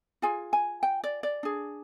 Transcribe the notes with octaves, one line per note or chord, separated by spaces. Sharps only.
F4 G#4 G#5
G#5
G5
D5
D5
D4 G#4